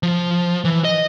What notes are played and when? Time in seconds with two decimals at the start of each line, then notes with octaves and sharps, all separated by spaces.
0.03 F3
0.65 E3
0.84 D#5